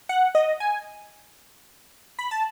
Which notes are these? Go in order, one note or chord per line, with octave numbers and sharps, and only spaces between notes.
F#5
D#5
G#5
B5
A5